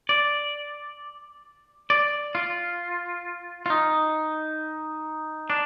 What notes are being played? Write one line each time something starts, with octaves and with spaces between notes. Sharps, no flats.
D5
D5
F4
F4
D#4
D4